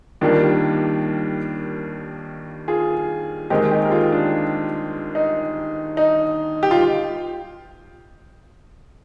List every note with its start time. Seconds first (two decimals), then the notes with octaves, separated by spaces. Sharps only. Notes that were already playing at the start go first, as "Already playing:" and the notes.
0.21 D#2 D#3 G3 A#3 D4 F4
2.68 F4 G#4
3.50 D#2 D#3 G#3 C4 D#4 G4
3.71 D#4 G4
3.84 A#4
3.91 F4 G#4
4.12 D4
5.15 D#4
5.97 D#4
6.63 G4
6.71 F4